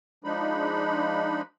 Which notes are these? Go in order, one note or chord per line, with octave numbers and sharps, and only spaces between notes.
F3 G#3 D4 D#4 B5